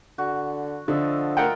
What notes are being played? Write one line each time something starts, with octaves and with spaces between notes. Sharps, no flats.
D3 F#4
D3 F3 A4 D#5 E5
F4 A#4 F#5 G5